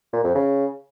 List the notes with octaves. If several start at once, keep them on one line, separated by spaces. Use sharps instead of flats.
A#2
F2
C#3